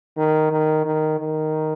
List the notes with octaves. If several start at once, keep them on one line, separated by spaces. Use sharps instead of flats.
D#3
D#3
D#3
D#3